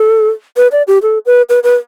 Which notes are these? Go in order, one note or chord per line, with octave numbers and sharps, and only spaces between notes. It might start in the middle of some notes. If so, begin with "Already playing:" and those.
Already playing: A4
B4
D5
G4
A4
B4
B4
B4